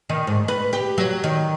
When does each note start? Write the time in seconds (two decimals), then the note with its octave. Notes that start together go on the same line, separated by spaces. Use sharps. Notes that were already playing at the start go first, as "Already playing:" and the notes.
0.10 D#3
0.27 G#2
0.48 B4
0.73 G4
0.98 F#3
1.24 D#3